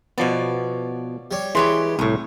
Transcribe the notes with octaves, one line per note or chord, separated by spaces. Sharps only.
B2 F3 B3 C#5 D5
G3 C#5
E3 G#3 G4 B4 C#5 C6
C2 A2 C#6 D#6